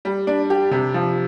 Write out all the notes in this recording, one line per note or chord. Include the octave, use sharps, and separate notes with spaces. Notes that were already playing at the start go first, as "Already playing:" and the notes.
G3
D4
G4
C3
F3